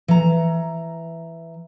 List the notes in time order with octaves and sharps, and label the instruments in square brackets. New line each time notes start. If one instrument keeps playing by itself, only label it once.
[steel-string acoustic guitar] E3 A#5